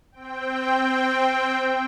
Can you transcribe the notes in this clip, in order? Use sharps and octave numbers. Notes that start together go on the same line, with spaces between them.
C4 G5